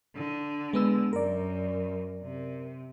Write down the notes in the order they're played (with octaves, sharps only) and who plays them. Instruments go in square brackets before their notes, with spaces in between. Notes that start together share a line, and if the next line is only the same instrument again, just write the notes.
[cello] D3
[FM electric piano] G#3 B3 E6
[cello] F#2 [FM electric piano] A#4 D5
[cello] C3